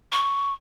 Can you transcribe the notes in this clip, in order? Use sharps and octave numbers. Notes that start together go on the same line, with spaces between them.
C#6